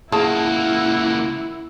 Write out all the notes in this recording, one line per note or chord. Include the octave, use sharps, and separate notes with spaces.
C#2 A#3 E4 G#4 F#5 A5